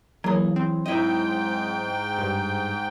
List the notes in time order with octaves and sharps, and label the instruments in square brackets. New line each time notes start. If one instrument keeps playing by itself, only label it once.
[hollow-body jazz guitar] E3 G#4 [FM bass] F#3 [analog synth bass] A#3
[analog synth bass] C4
[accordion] G#2 G5 [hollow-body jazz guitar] E4 D#5
[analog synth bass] G2